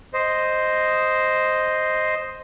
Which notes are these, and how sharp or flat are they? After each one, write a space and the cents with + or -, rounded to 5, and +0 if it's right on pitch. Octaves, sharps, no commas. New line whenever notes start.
C5 +0 D#5 +0